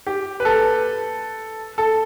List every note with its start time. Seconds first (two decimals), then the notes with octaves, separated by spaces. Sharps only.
0.07 G4
0.40 B4
0.45 A4
1.78 A4